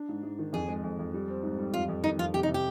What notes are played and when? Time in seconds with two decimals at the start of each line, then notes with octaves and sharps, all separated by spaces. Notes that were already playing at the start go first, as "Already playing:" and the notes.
Already playing: D4
0.09 G#2
0.23 G#2
0.39 D#3
0.53 F2 G#4
0.69 G#3
0.83 F2
0.99 F2
1.14 G3
1.28 C4
1.43 G#2
1.59 G3
1.74 F2 F4
1.88 F2
2.03 D#3 D#4
2.18 F2 F4
2.34 C3 G4
2.43 D#4
2.48 C3
2.54 G4